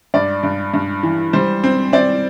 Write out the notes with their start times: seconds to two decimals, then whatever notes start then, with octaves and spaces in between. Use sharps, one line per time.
0.14 G2 D5
0.43 G2
0.74 G2
1.03 E3
1.33 G3 C5
1.64 C4
1.93 C4 D5